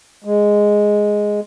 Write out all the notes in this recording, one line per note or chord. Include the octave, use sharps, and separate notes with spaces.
G#3